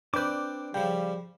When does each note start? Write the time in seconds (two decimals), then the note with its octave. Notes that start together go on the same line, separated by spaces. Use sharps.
0.14 C4 D4 B4 D5 D6 F#6 G6
0.74 C#3 F3 G3 G5